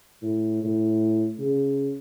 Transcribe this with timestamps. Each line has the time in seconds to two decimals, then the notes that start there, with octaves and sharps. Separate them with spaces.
0.23 A2
0.64 A2
1.39 C#3